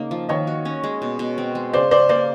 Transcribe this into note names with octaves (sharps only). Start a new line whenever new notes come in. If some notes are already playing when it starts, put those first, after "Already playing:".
Already playing: C#3 A#3 D#4
F3
D#3 C#5 D#5
F#4
C#4
G#3
B2
B2
C4
G#3
C#3 C5 D5
C#3 C5 D5
A#3 C5 D5